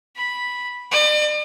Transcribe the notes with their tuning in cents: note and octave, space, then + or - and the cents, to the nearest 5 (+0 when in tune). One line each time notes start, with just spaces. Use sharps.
B5 -5
D5 +40